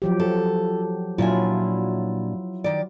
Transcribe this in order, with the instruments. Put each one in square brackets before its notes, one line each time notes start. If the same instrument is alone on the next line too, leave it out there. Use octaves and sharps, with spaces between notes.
[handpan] F3 F#3 G4
[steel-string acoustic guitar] A4
[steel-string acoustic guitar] A#2 D4 G#5 [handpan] F#3 E4 F4
[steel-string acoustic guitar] D#3 D5